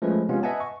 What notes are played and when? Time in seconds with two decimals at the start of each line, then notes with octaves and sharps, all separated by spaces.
0.02 F3 G#3 A3 C#4 B4
0.29 C3 G#3 B3 C#4 F4
0.43 B4 D#5 E5 F#5 G#5 A5
0.60 C#6